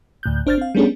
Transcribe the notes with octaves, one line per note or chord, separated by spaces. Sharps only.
D2 A2 F#6 G6
G1 D4 C5 F6 G6 A6
C4 F5
G3 A3 B3 C#4 D4 G#4